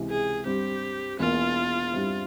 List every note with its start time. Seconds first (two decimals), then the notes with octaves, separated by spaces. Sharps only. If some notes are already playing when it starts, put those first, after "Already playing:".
Already playing: C#2 C3 E3
0.09 G#4
0.46 G2 G3 C4 G4
1.19 E1 E2 E3 A#3 F4
1.92 G2 G3 C4 E4